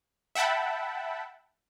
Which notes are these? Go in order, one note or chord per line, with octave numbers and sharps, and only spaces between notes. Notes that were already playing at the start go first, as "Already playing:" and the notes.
E5 F#5 G5 A5 B5